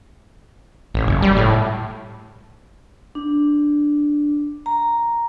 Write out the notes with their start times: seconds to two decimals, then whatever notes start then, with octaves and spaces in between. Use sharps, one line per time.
0.94 A1
1.07 F#1
1.22 G3
1.36 A2
3.15 D4
4.66 A#5